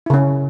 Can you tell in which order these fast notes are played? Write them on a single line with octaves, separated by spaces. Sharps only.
E4 C#3 C#4